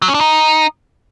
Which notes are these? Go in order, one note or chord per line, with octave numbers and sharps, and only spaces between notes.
F#3
C#4
D4
D#4